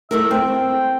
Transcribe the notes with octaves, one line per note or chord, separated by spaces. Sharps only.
A3 E4 A#4 E5
C4 G5